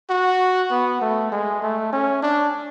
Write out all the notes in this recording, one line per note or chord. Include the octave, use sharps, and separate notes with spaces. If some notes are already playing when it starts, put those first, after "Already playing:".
F#4
B3
A3
G#3
A3
C#4
D4